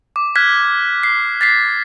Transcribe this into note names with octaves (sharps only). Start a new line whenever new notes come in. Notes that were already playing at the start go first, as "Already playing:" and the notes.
D6
F6 F#6 G#6 B6
C7
A6 B6 C7